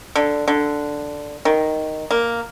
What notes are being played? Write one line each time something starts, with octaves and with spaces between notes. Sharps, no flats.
D3
D3
D#3
A#3